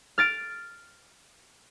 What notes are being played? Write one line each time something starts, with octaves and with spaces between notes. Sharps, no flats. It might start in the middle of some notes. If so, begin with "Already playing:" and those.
F6 A6 D7